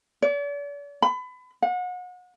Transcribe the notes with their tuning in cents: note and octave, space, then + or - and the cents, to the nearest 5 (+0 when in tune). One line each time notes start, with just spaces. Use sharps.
D5 -45
B5 +30
F#5 -35